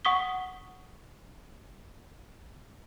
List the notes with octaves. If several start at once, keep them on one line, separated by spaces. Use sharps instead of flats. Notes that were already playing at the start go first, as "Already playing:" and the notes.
F#5 C#6 D#6 B6 G7